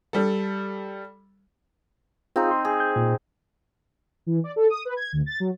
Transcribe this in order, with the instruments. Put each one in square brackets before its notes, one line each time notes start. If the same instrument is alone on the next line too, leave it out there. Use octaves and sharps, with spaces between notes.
[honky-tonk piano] G3 A4
[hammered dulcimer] C4 D#4 [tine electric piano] F4 G#4 F5
[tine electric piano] C6
[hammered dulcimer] G#4
[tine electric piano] G6
A#2
[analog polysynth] E3
D5
A4
D#6
B4
G#6
D2
A6
F#3